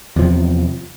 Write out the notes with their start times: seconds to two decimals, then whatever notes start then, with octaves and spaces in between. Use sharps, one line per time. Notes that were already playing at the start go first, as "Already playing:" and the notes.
0.16 E2
0.19 F3
0.22 C3